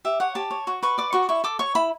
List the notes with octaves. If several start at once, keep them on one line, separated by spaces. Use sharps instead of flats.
G4 E5
C#5 F#5
G4 A5
C#5
F#4 C#6
B4 C#6
D5 D6
F#4 C#6
E4 C#6
A4 D6
C#5 C#6
E4 B5